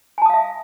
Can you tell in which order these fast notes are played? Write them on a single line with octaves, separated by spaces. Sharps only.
G#5 A5 D#6 F5 E5